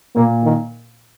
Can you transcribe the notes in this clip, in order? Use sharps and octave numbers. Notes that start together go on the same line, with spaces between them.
A#2 A#3
D#3